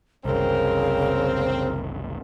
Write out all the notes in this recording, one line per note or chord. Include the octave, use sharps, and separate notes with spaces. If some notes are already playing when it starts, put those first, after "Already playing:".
F#1 C2 C#3 C4 A#4